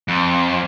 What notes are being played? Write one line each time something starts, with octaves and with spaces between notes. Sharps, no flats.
F2